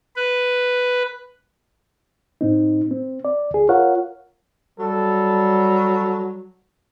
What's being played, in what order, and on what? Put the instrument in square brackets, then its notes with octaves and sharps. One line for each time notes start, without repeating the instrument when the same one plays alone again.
[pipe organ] B4
[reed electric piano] A2 C4 D#4
C4
D5
D2 G#4
F4 A#4 C#5 F5 F#5
[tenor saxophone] F#3 [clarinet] G3 [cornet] A4